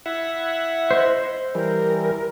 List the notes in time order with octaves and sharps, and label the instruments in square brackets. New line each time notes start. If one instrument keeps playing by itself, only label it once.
[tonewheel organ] E4 E5 F#5
[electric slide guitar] C5 [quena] D#5
[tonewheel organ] E3 G3 [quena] A#4